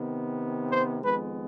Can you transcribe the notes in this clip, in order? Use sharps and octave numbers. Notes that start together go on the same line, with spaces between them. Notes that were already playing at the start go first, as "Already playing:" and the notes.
Already playing: C3 D#3 B3
C5
F2 D#3 G#3 B3 B4